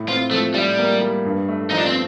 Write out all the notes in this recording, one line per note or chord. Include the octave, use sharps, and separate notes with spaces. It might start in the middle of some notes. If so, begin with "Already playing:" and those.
Already playing: A2
C4 F4
F3 A3
A2 G3
A#3
G3
G2
A3
F3 D#4
D4
C4